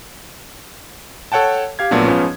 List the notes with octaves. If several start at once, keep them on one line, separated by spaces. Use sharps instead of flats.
A4 C#5 F#5 G5 A5
G4 F5 G#6
A#1 A#2 F#3 A3 B3 D4
G#2 F3 B3 C#4